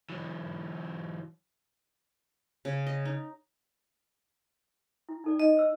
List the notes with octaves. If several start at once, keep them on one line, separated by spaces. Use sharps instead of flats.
E3 F#3
C#3
D#5
D#4
E4
D#4 A4 D5
D#4 D#5
C5 E6